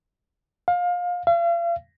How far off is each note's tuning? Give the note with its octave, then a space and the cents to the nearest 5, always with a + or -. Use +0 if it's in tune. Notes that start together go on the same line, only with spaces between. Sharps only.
F5 +25
F5 -40